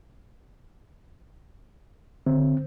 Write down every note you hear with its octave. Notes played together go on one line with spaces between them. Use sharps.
D3 C4